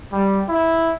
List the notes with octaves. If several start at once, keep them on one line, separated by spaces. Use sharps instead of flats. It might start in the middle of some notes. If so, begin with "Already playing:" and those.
G3
E4